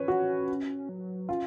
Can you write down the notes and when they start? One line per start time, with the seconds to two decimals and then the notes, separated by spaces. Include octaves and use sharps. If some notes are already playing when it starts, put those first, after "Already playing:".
Already playing: C#4 B4 C#5
0.08 F#4
0.89 F#3
1.29 C#4 F4